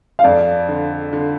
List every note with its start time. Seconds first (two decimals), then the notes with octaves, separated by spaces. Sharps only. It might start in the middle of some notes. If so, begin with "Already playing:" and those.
0.19 F5
0.24 F2 D5
0.69 D3
1.13 D3